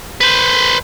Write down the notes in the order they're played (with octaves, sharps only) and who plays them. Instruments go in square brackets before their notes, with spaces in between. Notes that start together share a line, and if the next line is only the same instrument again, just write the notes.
[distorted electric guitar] B4 C5